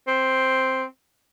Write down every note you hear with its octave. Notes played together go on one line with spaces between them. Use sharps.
C4